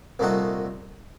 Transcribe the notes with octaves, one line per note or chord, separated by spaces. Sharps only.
C2 A#2 A3 D#4 F#4